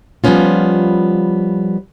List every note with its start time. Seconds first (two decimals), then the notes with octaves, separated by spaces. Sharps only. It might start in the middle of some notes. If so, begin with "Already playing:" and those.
0.24 F3 G3 A3 B3 C#4 F4